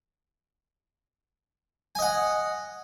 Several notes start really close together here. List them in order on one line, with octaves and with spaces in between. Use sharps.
G#5 D#5 F#5